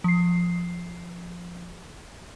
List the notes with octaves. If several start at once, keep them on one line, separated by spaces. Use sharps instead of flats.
F3 C7